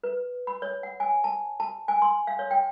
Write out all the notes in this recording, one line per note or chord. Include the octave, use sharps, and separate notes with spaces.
B4
B5
C#5
F#5
G#5
A5
A5
G#5
C6
F5
C#5
G5